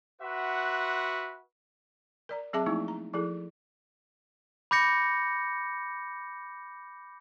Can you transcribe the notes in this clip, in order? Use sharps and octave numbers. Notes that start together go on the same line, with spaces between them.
F#4 B4 E5 F#5 C6
A#4 D5 A#5
F#3 C4 G#4 E5 A5 D6
F3 A3 A#3 D#4 E4
A#5
F3 E4 G#4 A4
B5 D6 G6 A#6 C#7